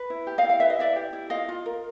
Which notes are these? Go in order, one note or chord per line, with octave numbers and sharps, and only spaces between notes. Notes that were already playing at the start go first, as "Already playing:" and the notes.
Already playing: B4
E4
G4
D#5 F5
E4
F5
B4 E5
D#5
E4 D5 E5
G4
E4
F4 D#5 F5
F4
A#4